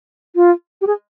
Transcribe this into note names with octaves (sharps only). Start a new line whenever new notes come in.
F4
G4
G#4